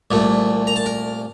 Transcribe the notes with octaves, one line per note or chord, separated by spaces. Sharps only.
C2 A#2 A3
A#5
A5
A#4